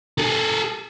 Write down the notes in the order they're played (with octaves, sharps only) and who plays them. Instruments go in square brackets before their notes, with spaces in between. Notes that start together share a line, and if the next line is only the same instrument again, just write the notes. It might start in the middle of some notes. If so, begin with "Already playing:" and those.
[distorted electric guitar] G#4 A4